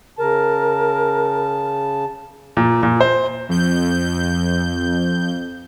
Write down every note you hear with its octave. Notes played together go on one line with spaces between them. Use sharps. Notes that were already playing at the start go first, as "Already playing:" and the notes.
C#3 A#4 A5
A#2
A#2
C5
F2 G6